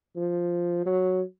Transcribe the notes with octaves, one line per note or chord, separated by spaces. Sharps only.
F3
F#3